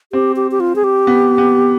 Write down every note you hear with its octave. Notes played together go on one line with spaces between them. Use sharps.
C4 G4
G4
G4
F4
G#4
G4
B3
B3